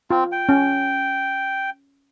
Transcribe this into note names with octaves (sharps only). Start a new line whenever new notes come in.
C4 F4
G5
C#4